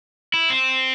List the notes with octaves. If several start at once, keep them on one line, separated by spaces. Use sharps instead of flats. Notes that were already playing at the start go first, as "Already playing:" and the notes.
E4
C4